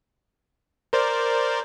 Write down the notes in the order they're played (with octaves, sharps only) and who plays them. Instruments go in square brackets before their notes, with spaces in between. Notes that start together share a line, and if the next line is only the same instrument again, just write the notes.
[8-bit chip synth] A#4 C5 D5